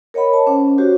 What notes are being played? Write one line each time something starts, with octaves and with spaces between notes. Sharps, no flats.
A#4 C#5 D#5 F#5 B5
A5
C#4 C5 F#5 D6
F#4 G4 C5 C#5